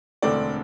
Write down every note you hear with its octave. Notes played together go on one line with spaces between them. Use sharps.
E1 D2 D3 A3 C4 D5